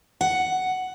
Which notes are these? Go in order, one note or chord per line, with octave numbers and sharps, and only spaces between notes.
F#5